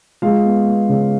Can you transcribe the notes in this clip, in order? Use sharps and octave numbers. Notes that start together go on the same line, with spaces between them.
G#3 F4 F5
B3
B3
C#3